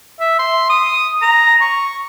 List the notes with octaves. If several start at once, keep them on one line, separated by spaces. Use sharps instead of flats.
E5
C6
D#6
A#5
C#6